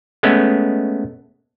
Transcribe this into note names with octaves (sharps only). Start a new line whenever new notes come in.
G#3 A3 B3 C#4